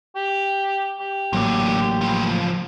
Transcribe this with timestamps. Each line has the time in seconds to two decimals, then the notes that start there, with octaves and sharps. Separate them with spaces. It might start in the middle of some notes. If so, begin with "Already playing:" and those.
0.16 G4
1.00 G4
1.33 A1 G#2 D3 F#3 A#3
2.01 C#2 F3